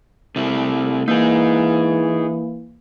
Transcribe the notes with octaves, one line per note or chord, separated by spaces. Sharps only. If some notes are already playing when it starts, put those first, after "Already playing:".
C3 A3 E4
E3 A#3 D#4 G#4